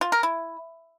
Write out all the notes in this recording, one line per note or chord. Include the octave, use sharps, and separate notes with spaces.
F4
A#4
E4